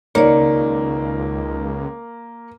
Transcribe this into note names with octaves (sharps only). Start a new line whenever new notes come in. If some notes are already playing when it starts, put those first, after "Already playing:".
C#2 D#3 A#3 C#5 D5